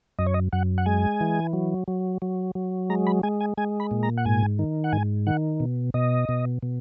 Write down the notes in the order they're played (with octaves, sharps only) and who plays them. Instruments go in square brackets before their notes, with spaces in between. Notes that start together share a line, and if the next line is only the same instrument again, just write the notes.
[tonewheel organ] F#2 D#5
C#5
D#5
F#2 F#5
F#5
G#3 G#5
E3
F#3
F#3
F#3
F#3
G#3 A#5
B5
G#3 G#5
G#5
G#3 G#5
B5
A#2
A#5
F#5
G#2 G#5
D#3
F#5
G#2 G#5
D#3 F#5
B2
B2 D#5
B2
B2